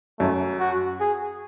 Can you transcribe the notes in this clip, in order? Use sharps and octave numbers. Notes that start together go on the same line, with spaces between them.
F#2 A3
F#4
G#4